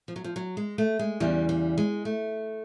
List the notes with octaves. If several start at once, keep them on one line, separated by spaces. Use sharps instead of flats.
F3
F#3
F3
F#3
G#3
A3
G#3
E2 C#3 E3 G3
G3
G#3
A3